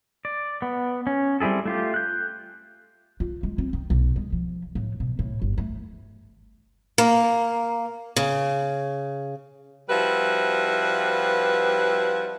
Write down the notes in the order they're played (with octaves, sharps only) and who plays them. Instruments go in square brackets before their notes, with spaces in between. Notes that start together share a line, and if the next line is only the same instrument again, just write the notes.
[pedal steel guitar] D5
B3
C#4
G3 C4 E4 G#4 A4
A3 F4 G4
F#6 G6
[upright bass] F4
G#3
C4
D#3
B1
G#3
F3
A2
B2
A2
G1
A3
[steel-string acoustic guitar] A#3
C#3
[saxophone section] F3 G3 C4 E4 F#4 B4